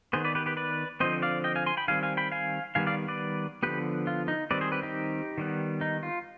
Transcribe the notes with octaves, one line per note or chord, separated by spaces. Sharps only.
D#3 B3 G#4 C5
B4 D5
G4 B4
G4 B4
B4 D5
D3 F3 C4 C5 D#5
D5 F5
D#5 G5
F5 G#5
G#5 C6
G5 B5
D#3 G3 C4 F5 G#5
F5 G#5
G5 B5
F5 G#5
D#3 G3 B3 F5 G#5
D5 F5
B4 D5
D3 F3 B3 G4 B4
F4
D#4
D#3 G3 C4 B4 D5
G#4 C5
G4 B4
D#4 G4
D#3 G3 B3
D#4
F4